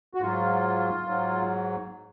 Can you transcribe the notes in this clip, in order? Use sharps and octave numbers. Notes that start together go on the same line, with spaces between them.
F#4
G#2 F#3 F4
G#2 F#3